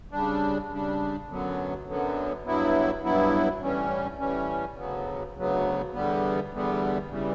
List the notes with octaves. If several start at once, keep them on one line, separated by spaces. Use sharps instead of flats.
C#3 G3 D4
C#3 G3 D4
F#2 D3 F#3 B3
F#2 D3 F#3 B3
G2 F#3 B3 E4
G2 F#3 B3 E4
A2 E3 G3 C#4
A2 E3 G3 C#4
D2 C#3 F#3 B3
D2 C#3 F#3 B3
E2 D3 G3 B3
E2 D3 G3 B3
C#3 E3 G3